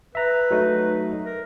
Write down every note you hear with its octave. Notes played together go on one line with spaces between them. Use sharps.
B4 E5 A#5
F#3 A3 D#4
A#4